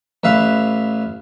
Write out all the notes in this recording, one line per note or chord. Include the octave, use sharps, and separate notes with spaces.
A1 B4 E5 F5